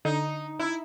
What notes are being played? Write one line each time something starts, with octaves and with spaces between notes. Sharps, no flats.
D3 D#4
E4